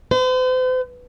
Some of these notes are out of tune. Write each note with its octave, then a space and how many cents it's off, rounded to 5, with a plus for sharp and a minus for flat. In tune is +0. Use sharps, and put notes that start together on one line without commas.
C5 -45